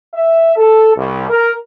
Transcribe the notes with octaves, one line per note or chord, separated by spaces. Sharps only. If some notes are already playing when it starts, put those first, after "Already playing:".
E5
A4
C2
A#4